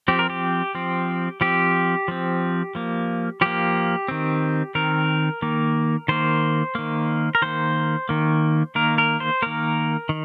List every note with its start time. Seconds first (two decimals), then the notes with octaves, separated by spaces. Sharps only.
0.08 F3 C4 G4
0.19 A#4
0.30 G4
0.75 F3 C4
1.41 F3 C4 G4
2.08 F3 C4
2.75 F3 A#3
3.41 F3 A#3 G4
4.08 D#3 C4
4.75 D#3 C4 A#4
5.42 D#3 A#3
6.08 D#3 A#3 C5
6.75 D#3 A#3
7.35 A#4
7.42 D#3 A#3 C5
8.09 D#3 A#3
8.75 D#3 A#3 A#4
8.98 A#4
9.20 C5
9.42 D#3 A#3 A#4
10.09 D#3